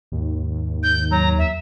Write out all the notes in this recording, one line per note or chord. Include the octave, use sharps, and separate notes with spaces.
D#2 G#2
G6
F#3 A#5
E2 E5